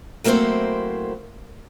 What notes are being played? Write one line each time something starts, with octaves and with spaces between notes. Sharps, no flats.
F#3 A3 A#3 C4 E4 C5